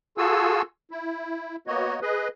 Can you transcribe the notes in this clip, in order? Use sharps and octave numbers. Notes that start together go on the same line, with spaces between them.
F4 F#4 G#4 A4 G#5 E6
E4
A#3 B3 F#4 C#5 D#5
G#4 B4 D#5